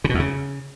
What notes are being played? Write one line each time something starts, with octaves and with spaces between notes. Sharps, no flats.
C#3
B2
E2
C#3